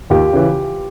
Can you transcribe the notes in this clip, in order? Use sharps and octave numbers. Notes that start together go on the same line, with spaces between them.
D#2 F4 G4
C#3 E3